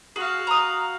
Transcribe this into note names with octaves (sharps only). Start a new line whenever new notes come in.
F#4 G#4 F5
A#5 D#6